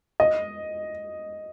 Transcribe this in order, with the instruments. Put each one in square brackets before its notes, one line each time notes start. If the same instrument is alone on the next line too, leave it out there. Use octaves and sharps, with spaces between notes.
[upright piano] D#5